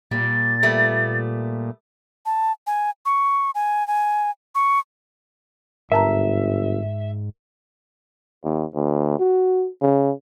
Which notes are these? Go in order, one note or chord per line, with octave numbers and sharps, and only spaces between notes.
A#2 G3 A6
G3 A3 B3
A5
G#5
C#6
G#5
G#5
C#6
G1 G#2 A#4 E5 A5 A#5
D#2
D2
F#4
C#3